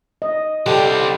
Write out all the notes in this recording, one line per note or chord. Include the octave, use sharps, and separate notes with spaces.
D#5
D3 G3 C4 G4